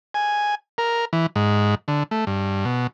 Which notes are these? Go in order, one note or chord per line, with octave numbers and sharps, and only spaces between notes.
G#5
A#4
E3
G#2
D3
A3
G2
B2